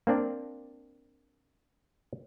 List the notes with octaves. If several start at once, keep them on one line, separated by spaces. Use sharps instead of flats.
A#3 C4 D4 D5